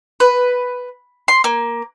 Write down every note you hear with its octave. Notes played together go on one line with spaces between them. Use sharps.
B4
C6
A#3